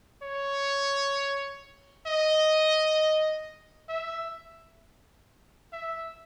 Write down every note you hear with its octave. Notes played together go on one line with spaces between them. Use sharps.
C#5
D#5
E5
E5